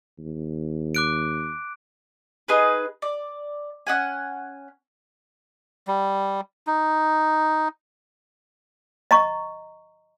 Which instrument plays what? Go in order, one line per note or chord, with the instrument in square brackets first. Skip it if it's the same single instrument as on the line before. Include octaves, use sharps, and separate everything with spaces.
[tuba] D#2
[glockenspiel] D6 F#6 D7
[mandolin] D#4 G#4 B4
D5
C#4 D#4 F#5 G#5
[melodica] G3
D#4
[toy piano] D#5 A#5 C#6